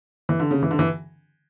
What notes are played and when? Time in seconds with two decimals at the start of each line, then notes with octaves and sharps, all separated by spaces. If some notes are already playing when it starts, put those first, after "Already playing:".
0.29 E3
0.40 D3
0.51 C#3
0.63 E3
0.71 D3
0.79 E3